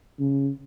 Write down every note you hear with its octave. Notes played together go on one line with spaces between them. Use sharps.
C#3